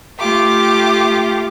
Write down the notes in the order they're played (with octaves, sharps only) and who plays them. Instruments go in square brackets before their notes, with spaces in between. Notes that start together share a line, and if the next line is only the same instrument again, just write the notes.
[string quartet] A3 F4 G4 [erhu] D6